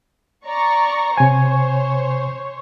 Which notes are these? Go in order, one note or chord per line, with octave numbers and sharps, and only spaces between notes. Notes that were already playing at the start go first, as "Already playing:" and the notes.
D5 A#5 C#6
C3 C5 C#5 G#5